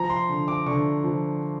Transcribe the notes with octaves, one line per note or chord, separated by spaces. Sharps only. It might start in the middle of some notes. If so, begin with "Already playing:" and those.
Already playing: F3 A#5
C6
D3
D6
D3 C#6
F3